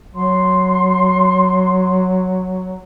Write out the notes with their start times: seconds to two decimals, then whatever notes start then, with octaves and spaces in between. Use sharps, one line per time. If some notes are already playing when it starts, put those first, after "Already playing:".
0.14 F#3 C6